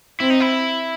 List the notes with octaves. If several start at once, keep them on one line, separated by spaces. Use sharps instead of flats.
C4 E4
D#4
E4